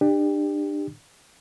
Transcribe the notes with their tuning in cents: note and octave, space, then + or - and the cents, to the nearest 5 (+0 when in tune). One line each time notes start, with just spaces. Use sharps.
D4 +30 G4 +25